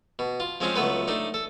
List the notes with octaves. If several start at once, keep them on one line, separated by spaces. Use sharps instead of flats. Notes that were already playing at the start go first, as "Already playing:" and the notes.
B2
F4
F3 G#3 C4 C#4 F4
C#2 F#3 A3 B3 B4
A3 D4 D#4
A4